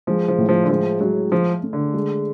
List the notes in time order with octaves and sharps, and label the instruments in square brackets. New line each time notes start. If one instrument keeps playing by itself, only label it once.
[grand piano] F3 [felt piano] G#3
[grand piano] F3
[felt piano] A2
[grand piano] F3
D3
[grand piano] F3 [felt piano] G#3
[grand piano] F#3 [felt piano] G#3
[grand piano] F3 [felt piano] G#4
[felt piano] A3
[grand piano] D3
[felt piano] G#3